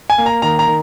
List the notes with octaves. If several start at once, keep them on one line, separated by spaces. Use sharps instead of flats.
G#5
A#3
A#5
D#3 A#5
A#5
D#3